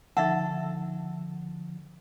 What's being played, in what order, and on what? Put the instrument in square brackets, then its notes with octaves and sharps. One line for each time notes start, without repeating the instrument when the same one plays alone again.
[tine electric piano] D3 F3 [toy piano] D#4 E5 F#5 [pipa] A4